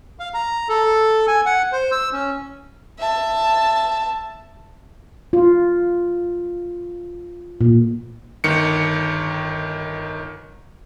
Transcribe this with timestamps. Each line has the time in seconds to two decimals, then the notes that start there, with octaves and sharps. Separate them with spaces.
0.20 F5
0.34 A#5
0.69 A4
1.28 G#5
1.46 F#5
1.72 C5
1.92 E6
2.13 C#4
2.99 E5 A5
5.33 F4
7.61 A#2
8.44 G1 D#3 C#7